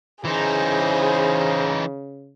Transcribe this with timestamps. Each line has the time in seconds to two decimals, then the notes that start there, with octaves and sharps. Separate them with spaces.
0.25 C#3 E3 D#4 G#4 C5